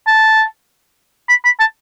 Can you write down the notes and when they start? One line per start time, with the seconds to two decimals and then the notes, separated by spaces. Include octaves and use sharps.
0.07 A5
1.29 B5
1.45 B5
1.60 A5